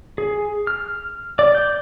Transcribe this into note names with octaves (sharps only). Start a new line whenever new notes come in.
G#4
F6
D5
G6